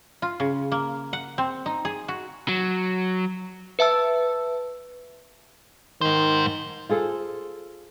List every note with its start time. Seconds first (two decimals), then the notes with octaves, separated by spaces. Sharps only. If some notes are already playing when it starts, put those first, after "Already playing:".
0.22 F4
0.40 C#3
0.72 A#3
1.13 F#5
1.38 C4
1.66 D#4
1.85 G#4
2.08 F#4
2.48 F#3
3.79 B4 E5 A5 E6
6.01 G#2 D#3 C5
6.89 F4 G#4 A4 C5